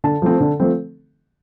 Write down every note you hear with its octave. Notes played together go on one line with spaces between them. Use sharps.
D3 A5
F3 A3 C4
D3
F3 A3 C4